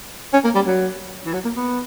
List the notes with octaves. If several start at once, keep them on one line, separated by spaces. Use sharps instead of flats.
C#4
A#3
G3
F#3
E3
F#3
A#3
B3